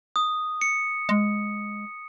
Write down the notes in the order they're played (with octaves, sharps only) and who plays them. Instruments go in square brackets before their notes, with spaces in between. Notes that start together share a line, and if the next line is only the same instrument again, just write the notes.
[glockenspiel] D#6
C#7
[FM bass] G#3